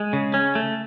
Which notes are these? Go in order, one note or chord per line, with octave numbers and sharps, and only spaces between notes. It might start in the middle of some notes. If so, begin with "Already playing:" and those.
Already playing: G#3
C#3
C#4
A3